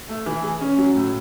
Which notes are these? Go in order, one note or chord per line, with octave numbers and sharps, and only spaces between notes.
A3
E3
G#4
C#4
F#3
A2